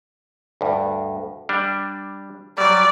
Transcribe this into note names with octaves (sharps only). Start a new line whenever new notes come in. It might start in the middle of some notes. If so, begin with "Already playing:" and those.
D2 G2
G3 D4
F#3 G3 D5